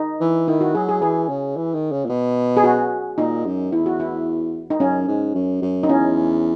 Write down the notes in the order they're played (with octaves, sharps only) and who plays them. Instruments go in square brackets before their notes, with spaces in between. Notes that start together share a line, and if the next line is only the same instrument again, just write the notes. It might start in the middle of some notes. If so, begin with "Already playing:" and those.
Already playing: [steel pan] D#4
[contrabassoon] E3
[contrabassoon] D#3 [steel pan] E4
[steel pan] F#4
[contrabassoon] F#3 [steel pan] G#4
[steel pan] G#4
[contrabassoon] E3 [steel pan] G#4
[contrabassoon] C#3
E3
D#3
C#3
A#2
B2
[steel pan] G#4
F#4
[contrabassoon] A#2 [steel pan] D#4
[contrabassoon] F#2
[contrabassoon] E2 [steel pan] E4
[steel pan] F#4
E4
D#4
[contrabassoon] F#2 [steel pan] C#4
[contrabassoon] G#2
F#2
F#2
[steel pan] D#4
[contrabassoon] E2 [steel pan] C#4